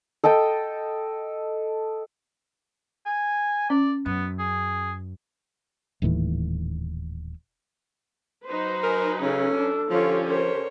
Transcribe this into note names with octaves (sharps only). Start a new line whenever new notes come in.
A4 D#5 G5 A5
G#5
C#4 D5
F#2 B3
G#4
D#1 D#2 A2 E3
F#3 D#4 B4 C5
A#4 G#5
C#3 C#4 A4
D4
D3 F3 C#4 F4 G4 C#5
A#4 C5 C#5